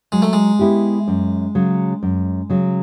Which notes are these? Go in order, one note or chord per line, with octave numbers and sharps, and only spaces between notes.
F#3 G#3
A3
G#3
B3 E4 G4
F#2
C#3 F#3
F#2
C#3 F#3